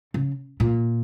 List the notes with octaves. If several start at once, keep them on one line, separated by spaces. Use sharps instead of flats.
C#3
A#2